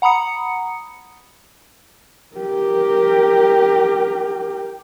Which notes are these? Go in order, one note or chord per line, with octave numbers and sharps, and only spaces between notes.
F#5 A#5 B5 D#6 C#7
G4 A#4